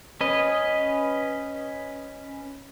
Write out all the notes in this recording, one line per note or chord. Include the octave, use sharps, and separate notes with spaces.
C#4 B4 D#5